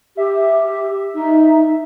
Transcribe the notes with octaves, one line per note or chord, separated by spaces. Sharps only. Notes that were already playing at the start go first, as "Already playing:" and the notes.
G4 E5
D#4